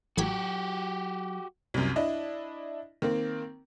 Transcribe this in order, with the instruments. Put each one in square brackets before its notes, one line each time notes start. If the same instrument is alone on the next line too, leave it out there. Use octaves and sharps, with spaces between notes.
[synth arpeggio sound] A1 G#6 B6 [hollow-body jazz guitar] F#3 [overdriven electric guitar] F#4 G4
[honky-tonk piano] C2 F#2
D4 E4 D#5
D#3 A#3 C4